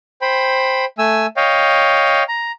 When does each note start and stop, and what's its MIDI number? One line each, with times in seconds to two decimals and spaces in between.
0.22 0.85 72
0.22 0.85 79
0.22 0.85 83
0.98 1.26 57
0.98 1.26 80
0.98 1.26 88
1.37 2.23 73
1.37 2.23 75
1.37 2.23 77
1.37 2.23 79
2.28 2.52 82